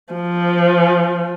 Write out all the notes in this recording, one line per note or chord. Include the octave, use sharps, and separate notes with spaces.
F3